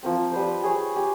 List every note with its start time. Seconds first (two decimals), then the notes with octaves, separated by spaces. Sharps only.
0.03 F3 A#3 C4
0.31 G3 B4 C5
0.62 G4 G#4 C#5
0.96 G4